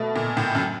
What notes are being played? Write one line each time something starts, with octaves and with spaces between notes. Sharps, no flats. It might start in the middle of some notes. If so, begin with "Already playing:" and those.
Already playing: B2 A3
A#2
A2
F#2